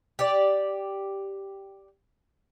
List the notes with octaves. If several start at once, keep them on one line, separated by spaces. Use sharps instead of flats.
G4 D5